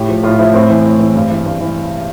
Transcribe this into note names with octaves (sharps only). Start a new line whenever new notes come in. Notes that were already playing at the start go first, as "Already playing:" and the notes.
Already playing: A2 G4
F3
A2 F4
F3 E4
A2 C4
E3
A2
E3
G2
E3
G2
E3